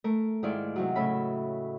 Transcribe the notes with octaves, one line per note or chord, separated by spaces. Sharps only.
A3 A#4
G#2 D#3 E4 F4 D5
C3 D#3 F#3
A2 C#3 E5 B5